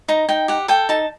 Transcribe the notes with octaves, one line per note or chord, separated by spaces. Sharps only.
D#4 A#5
D#4 G5
G4 F#5
A4 G5
D#4 A5